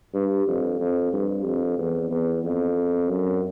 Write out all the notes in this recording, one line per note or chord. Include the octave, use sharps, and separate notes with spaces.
G2
F2
F2
G2
F2
E2
E2
F2
F#2